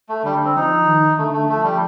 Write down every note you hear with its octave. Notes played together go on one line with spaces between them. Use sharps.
A3
D3 G3
C4
F3 D#4
D#3
D3 A3
A3
F3 A3
G3